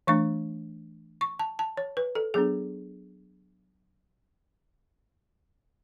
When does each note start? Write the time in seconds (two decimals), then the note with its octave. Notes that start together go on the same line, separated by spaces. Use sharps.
0.07 E3 A3 D4 C#6
1.21 C#6
1.39 A5
1.59 A5
1.77 C#5
1.97 B4
2.15 A4
2.34 F#3 B3 D4 G#4